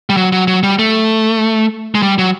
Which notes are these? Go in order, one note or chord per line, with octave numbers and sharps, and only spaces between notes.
G3
F#3
F#3
F#3
G3
A3
G#3
G3
F#3